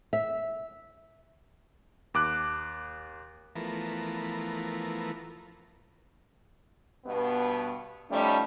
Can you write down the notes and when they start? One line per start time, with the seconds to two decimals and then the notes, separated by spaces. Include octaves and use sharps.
0.13 E5
2.14 D#2 D6 F#6
3.55 E3 F3 A3 B3 A#4
7.06 G2 B2 B3
8.11 F3 G3 A3 C#4 D#4